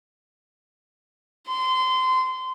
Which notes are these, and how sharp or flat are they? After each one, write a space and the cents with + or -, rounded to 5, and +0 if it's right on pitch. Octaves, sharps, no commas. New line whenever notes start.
C6 -25